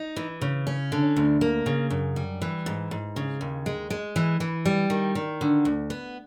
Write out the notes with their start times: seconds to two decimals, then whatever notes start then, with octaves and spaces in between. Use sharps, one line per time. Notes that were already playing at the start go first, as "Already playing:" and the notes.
Already playing: D#4
0.16 E3
0.41 C#3
0.67 C#4
0.92 D3
1.16 D2
1.41 A#3
1.66 C#3
1.90 F#2
2.16 G3
2.42 E3
2.66 G#2
2.91 G#2
3.16 C#3
3.41 D#2
3.66 G#3
3.90 G#3
4.16 E3
4.40 E3
4.65 G3
4.90 D#3
5.15 D#3
5.41 D3
5.65 D2
5.90 B3